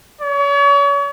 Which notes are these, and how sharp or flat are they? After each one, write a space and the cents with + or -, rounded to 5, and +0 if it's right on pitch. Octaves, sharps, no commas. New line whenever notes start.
C#5 +35